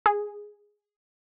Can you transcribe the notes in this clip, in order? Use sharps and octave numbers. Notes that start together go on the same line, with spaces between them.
G#4